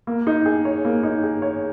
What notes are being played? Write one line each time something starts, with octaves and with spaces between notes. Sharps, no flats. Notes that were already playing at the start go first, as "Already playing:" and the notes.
A#3
D#4
G#4
C#5
A#3
D#4
G#4
C#5